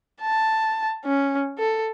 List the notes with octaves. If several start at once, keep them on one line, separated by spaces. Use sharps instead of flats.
A5
C#4
A4